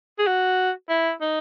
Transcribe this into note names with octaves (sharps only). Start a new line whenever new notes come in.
G#4
F#4
E4
D#4